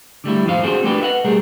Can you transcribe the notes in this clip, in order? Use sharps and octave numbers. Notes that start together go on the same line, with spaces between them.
D3 G3 A3 E4
F2 A2 D#3 A3 C5 F5
C4 D4 F#4 G#4 A4 C5
A3 A#3 D4 G4 A4 B4
B4 D#5 E5 F#5
B1 G3 A3 G#4 A#4